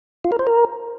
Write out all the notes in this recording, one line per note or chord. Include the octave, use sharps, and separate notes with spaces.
F4
A#4
C5
A#4